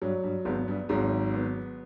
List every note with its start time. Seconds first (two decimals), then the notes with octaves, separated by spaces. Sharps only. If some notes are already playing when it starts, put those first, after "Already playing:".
0.02 G2 F#3
0.24 G2
0.45 G#1 G#2 B3
0.68 G2
0.89 G#1 G#2 F#3
1.34 B3